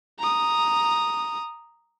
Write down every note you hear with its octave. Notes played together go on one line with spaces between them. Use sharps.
A#5 D#6